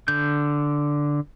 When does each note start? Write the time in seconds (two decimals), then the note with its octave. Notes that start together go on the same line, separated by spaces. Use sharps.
0.08 D3 G6